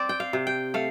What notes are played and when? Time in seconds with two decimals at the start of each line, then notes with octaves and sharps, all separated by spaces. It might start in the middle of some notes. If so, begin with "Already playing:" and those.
Already playing: C4 D5
0.09 G5
0.20 F5
0.33 C3
0.47 G5
0.74 A3 F5